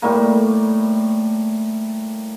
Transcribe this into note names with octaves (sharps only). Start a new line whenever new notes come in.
A2 G3 A3 A#3